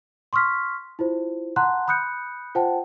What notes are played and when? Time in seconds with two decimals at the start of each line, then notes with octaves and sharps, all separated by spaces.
0.33 C6 C#6 D#6 F6 B6
0.99 E4 F4 C5
1.56 F#5 A5 A#5 C6 F#6
1.88 B5 D#6 F#6 G6 C#7
2.55 F4 C5 F#5 G5 A5